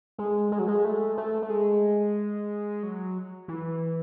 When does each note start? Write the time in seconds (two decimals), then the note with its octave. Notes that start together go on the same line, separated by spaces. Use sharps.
0.18 G#3
0.52 G#3
0.59 F#3
0.68 G#3
0.85 A3
1.17 A3
1.42 A3
1.50 G#3
2.83 F#3
3.48 E3